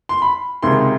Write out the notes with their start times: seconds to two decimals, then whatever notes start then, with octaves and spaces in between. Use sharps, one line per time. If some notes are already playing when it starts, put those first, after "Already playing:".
0.09 C6
0.22 B5
0.63 C#2 C3 D#3 C6